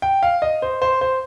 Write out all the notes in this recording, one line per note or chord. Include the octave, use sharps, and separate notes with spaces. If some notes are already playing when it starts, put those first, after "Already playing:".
G5
F5
D#5
C5
C5
C5